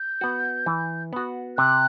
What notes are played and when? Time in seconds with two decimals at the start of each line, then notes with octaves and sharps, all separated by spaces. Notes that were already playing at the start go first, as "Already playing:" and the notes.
Already playing: G6
0.21 B3 F#4
0.66 E3
1.13 B3 F#4
1.58 C3 F#6